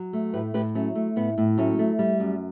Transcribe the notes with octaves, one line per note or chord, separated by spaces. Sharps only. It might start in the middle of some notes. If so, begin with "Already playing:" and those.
Already playing: F#3
A3
A2 G4 B4
A2 G4 B4
F#3 A3 C#4
A3
A2 B3
A2
F#3 A3 C#4
A3
G3
F#2